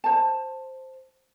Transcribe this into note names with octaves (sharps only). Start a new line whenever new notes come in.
C5 A5